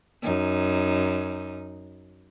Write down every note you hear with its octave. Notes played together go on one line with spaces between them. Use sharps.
F#2 D#4